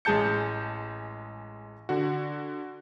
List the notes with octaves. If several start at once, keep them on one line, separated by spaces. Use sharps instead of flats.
A1 G#3 G#4 A5 G6 C#7
D3 F#4